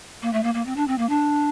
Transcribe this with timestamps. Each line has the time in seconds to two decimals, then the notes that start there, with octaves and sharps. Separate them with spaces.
0.22 A#3
0.33 A3
0.43 A#3
0.54 A#3
0.66 C4
0.76 D4
0.88 C4
0.98 A#3
1.09 D4